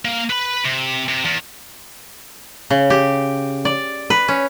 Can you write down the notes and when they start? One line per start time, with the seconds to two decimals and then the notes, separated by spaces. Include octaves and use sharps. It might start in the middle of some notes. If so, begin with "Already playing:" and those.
0.05 A#3
0.30 B4 B5
0.65 C3
1.09 C3
1.25 E2
2.70 C#3
2.90 G4
3.65 D5
4.10 B4
4.28 C#4